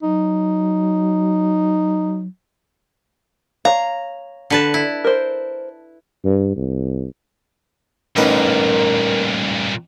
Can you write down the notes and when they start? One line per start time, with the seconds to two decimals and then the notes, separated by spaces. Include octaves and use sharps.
0.03 F#3 D#4
3.65 C#5 F5 A#5
4.50 D3 B4 A5
4.74 E4
5.04 A#4 C5
6.24 G2
6.56 C2
8.16 A1 G2 A#2 D#4 A#4 B4